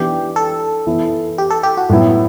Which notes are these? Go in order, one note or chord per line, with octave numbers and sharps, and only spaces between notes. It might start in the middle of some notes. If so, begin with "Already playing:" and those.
Already playing: E3 B3 D4 G4
A4
E3 B3 E4
G4
A4
G4
F#4
A2 F#3 B3 E4